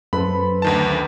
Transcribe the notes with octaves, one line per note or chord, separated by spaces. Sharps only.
F#2 A4 B4 C5 B5
D2 D#3 A5